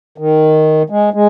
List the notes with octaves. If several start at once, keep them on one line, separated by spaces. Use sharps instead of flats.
D#3
G#3
G#3